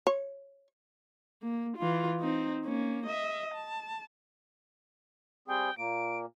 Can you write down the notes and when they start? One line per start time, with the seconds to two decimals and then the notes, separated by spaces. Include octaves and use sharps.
0.07 C#5
1.43 A#3
1.77 E3 F4
2.20 C4 D#4
2.65 A#3 C#4
3.06 D#5 E5
3.54 A5
5.48 G3 C4 G#4 G5
5.78 A#2 A#3 D7